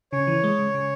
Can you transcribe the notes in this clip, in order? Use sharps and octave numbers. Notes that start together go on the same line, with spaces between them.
C#3 C#5
E3
G#3
C#3
C#3